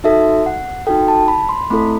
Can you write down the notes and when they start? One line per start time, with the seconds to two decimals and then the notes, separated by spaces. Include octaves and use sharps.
0.04 D#4 F#4 A4 E5
0.46 F#5
0.87 D#4 F#4 A4 G5
1.08 A5
1.28 B5
1.49 C6
1.70 A3 C4 E4 A4 B5